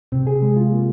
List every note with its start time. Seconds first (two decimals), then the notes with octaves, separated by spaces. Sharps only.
0.12 C3 C4
0.27 G#4
0.42 G#3
0.56 F4
0.72 A#3